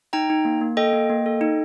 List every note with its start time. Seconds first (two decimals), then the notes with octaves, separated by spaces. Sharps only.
0.13 D#4 G5 A#5
0.30 D#4
0.45 A#3
0.61 A#3
0.77 A4 D#5 G5
0.93 A#3
1.09 A#3
1.26 A4
1.41 D#4